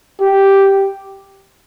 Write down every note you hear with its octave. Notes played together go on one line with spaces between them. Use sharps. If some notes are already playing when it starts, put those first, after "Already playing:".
G4